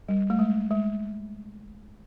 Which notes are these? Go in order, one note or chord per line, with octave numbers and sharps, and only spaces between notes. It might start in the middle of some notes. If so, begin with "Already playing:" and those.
G3
A3
G#3
G#3